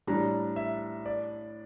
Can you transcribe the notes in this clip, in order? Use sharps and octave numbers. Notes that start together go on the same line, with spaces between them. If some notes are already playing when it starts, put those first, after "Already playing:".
A2 E3 G3 D4 A#5
E5
D5